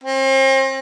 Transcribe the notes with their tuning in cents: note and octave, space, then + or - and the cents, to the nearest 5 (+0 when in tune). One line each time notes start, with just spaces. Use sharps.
C4 +40